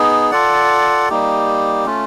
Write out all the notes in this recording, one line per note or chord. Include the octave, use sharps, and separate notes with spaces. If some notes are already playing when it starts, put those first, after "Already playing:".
Already playing: B3 D#4 G#4
F4 A4 D5 F#5
G3 A#3 D#4 G4
A3 C#4 F4